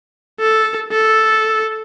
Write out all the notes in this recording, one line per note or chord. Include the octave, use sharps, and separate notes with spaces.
A4
A4